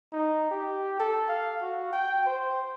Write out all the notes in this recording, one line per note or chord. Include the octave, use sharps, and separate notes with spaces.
D#4
G4
A4
F5
F#4
G5
C5